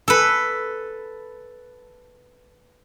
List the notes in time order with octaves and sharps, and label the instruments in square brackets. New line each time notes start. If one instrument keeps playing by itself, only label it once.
[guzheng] A4 B4